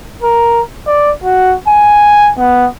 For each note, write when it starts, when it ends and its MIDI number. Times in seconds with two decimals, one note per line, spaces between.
0.22 0.61 70
0.87 1.11 74
1.24 1.55 66
1.68 2.31 80
2.38 2.67 59